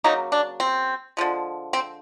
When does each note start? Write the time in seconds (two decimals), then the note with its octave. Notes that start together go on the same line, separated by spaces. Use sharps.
0.04 C#3 F#3 A#3 D#4
0.32 D4
0.60 C4
1.17 D3 F3 G#3
1.73 C4